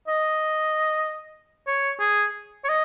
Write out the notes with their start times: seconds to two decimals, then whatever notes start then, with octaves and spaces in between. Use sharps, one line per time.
0.08 D#5
1.67 C#5
2.00 G#4
2.65 C#5
2.69 D#5